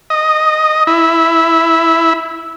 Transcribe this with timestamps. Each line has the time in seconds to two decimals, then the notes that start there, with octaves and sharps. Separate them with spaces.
0.10 D#5
0.87 E4